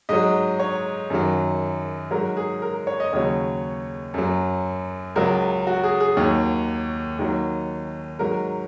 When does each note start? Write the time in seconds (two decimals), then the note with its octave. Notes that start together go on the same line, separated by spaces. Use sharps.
0.09 G#2 F#3 D#5
0.59 C#5
1.10 F#2 D#3 F#3
2.11 G#2 F#3 A#4
2.37 G#4
2.62 A#4
2.87 C#5
3.00 D#5
3.13 D#2 C#3 F#3 C#5
4.14 F#2 F#3
5.16 C#2 C#3 F#3 A#4
5.67 F#4
5.84 G#4
6.00 G#4
6.17 D#2 D#3 F#3 C#5
7.19 D#2 D#3 F#3
8.19 G#2 F#3 A#4